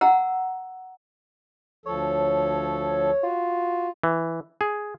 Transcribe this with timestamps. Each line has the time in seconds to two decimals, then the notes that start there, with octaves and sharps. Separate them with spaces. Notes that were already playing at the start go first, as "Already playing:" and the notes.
0.01 F#5 A#5 E6
1.86 D2 F3 A4 C#5
3.23 F4 F#4
4.03 E3
4.61 G#4